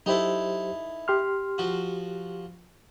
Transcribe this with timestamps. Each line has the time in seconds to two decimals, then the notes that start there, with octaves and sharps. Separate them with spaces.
0.06 F#3 D#4 E4 G4 A4 C5
1.08 G4 C6 F6
1.58 F3 F#4